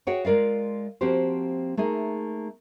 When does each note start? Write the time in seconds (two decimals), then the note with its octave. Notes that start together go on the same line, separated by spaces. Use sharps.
0.07 F#4 G#4 C#5 F#5 G5
0.25 G#3 F4 A#4 D5 F5
1.01 F3 A#3 C4 F#4 G4 C5
1.77 A3 A#3 D#4 G#4